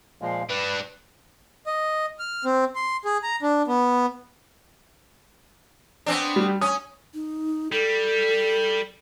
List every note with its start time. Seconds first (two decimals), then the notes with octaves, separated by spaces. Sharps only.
0.22 A#2 F3 G#3 F5
0.49 G3 D4 B4 F#6
1.67 D#5
2.19 F6
2.45 C4
2.76 C6
3.05 G#4
3.23 A#5
3.42 D4
3.67 B3
6.06 B3 C4 D4
6.36 G3
6.61 C#4 D#6
7.14 D#4
7.72 G3 A4